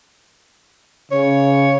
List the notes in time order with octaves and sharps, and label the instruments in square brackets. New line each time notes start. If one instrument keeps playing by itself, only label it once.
[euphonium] C#3 [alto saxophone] C#5